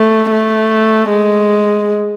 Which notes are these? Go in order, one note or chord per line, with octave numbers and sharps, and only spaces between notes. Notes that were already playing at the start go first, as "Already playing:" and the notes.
Already playing: A3
A3
G#3